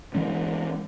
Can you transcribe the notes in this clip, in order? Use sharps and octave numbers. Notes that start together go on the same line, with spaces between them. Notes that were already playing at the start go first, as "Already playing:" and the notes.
E3 G#3 C#4